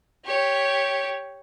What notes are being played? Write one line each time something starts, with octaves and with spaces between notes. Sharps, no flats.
G4 C#5